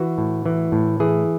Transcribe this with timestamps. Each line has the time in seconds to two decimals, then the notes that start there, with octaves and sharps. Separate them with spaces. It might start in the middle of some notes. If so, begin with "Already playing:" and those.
Already playing: E3 F#4
0.18 A2
0.46 E3
0.72 A2
1.00 E3 G#4